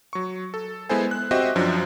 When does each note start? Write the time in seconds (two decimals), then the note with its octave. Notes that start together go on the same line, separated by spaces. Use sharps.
0.13 F#3 C#6
0.54 A4
0.89 G#3 B3 E4 A4 C5 G#5
1.11 F#6
1.31 C4 F#4 G4 C5 D#5 E5
1.56 F#2 F3 F#3 D4